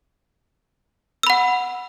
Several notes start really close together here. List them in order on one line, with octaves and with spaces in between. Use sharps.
E6 B5 F#5